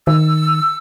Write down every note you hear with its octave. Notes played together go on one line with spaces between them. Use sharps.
D#3 E6